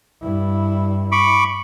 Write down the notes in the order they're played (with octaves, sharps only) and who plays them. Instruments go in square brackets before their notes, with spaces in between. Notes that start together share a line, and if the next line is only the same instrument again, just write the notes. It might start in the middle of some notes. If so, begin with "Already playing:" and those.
[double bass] G2 E4
[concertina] B5 C#6 D6